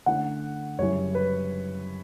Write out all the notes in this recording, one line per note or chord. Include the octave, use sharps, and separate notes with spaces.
D3 A3 C#4 E4 F#5
F#2 C#3 G3 C#4 E4 C#5
B4